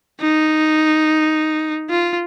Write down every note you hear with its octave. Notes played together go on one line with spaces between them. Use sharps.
D#4
F4